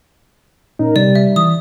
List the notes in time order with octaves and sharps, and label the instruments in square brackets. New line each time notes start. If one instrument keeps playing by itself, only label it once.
[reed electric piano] A#2 C#4 D#4 [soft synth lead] A#4
[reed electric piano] C3 [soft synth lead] G3 [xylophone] D5
[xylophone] E5
[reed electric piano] E3 [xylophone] D#6